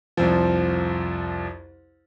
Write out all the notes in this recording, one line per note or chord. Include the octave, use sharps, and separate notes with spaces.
C2 F2 F3